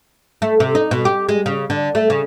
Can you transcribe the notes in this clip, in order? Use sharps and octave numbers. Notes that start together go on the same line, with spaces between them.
A3
C3
D#4
B2
G4
G#3
C#3
D3
A3
C#3